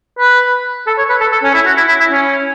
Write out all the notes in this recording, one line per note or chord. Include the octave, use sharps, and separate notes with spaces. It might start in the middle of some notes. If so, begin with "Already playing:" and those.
B4
A4
C#5
B4
A4
A4
C#4
E4
F#4
E4
E4
E4
C#4